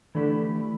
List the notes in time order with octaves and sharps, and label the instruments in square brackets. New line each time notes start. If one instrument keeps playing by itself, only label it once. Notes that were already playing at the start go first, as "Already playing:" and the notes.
[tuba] D3 [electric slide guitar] E3 A3 E4 G4